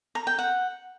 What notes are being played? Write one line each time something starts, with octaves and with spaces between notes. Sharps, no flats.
A#5
G5
F#5